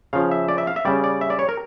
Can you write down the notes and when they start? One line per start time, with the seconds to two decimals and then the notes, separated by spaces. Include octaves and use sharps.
0.13 C#3 F3 F5
0.31 E5
0.48 D5
0.58 E5
0.67 F5
0.76 E5
0.85 C#3 G3 D5
1.04 D5
1.21 E5
1.30 D5
1.39 C#5
1.49 A#4